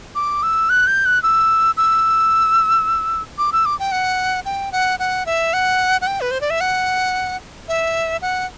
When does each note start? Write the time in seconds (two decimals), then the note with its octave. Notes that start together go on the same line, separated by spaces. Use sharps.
0.15 D6
0.43 E6
0.70 F#6
0.87 G6
1.06 F#6
1.23 E6
1.77 E6
3.38 D6
3.52 E6
3.66 D6
3.79 G5
3.92 F#5
4.45 G5
4.72 F#5
4.99 F#5
5.26 E5
5.53 F#5
6.01 F#5
6.07 G5
6.21 B4
6.31 C5
6.41 D5
6.50 E5
6.61 F#5
7.68 E5
8.22 F#5